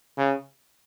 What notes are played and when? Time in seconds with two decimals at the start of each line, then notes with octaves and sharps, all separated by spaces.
0.17 C#3